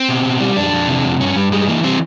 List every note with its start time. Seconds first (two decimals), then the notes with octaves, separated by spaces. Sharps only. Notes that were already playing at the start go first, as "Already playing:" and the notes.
Already playing: C4
0.09 B2
0.25 B2
0.40 G3
0.56 F2 D4
0.73 F2
0.88 C3
1.04 F2
1.20 G2 C#4
1.36 G2 G3
1.52 G3 G#3
1.68 E3 A#3
1.83 G3 C4